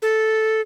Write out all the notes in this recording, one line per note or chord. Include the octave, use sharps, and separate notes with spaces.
A4